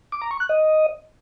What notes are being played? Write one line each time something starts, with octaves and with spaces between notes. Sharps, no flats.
D6
A#5
C#6
F#6
D#5